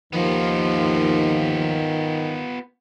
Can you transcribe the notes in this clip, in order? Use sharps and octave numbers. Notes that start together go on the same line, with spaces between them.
D#2 D#3 F3 B3 F4